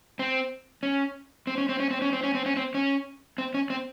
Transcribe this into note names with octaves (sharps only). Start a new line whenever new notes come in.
C4
C#4
C4
C#4
C4
C#4
C4
C#4
C4
C#4
C4
C#4
C4
C#4
C4
C#4
C4